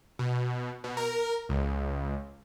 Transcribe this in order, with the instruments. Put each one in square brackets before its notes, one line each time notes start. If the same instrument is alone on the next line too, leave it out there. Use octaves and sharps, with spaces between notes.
[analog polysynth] B2
B2
A#4
C#2